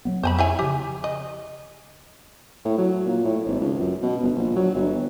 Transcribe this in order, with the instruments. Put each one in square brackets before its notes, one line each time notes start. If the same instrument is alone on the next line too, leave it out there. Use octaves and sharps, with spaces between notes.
[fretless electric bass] F#3 G3 B3
[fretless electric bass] F2 [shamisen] C5 G#5 B5
[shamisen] E4 C#5 G#5
[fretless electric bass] C#3 F3 [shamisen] G4
[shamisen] D#5
[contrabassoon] A2
F#3
A#2
A2
G#1
C#2
F#2
B2
G1
A#1
F#3
G1